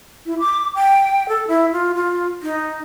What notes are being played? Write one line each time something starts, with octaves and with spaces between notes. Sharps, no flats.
E4
D6
G5
A4
E4
F4
F4
D#4